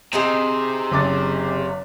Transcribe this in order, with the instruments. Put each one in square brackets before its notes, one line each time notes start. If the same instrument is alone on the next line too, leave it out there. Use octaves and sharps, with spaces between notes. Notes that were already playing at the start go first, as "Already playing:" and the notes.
[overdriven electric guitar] C3 [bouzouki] C4 D#4 G#4
[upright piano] F#1 D6 A6